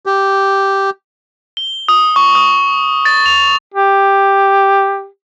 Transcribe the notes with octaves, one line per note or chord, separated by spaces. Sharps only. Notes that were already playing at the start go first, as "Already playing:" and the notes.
G4
G7
D#6
C#6
D#6
A6
F7
G4